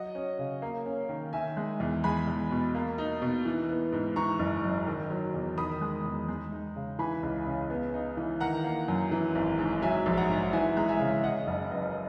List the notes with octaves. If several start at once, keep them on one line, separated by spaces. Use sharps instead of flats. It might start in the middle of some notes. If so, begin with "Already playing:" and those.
Already playing: F#3 D#5 F#5
C#4
C#3
A#3
C#4
D#3
D#3 E5 G#5
G#3
E2
G#3 G#5 B5
E2
B2
A#3
D#4
B2
E3
B3
G#2
E3 A#5 C#6
F#1
F#2
D#3
F#3
E2
D#3 B5 D#6
G#3
E2
G#3
D#4
C#3
E3 G#5 B5
C#2
C#3
B3
D#4
E3
D#3 F#5 A#5
A#3
F#2
E3
G#1
G#2
F#3 E5 G#5
A#1
F#5 A#5
G#2
E3 E5 G#5
G#3 A#5
E5 G#5
C#3
C#3 D#5 F#5
F#1
F#2 B4 D#5